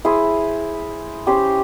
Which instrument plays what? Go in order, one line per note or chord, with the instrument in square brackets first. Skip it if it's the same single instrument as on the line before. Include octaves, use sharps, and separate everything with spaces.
[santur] E4 G#4 C5
C#4 G4 C5